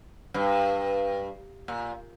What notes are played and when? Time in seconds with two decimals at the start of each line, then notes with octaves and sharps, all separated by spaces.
0.34 G2
1.68 A#2